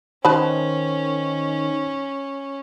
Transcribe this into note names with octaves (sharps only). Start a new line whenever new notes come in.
D#3 C#4 D#4 B4 C5 A5 B5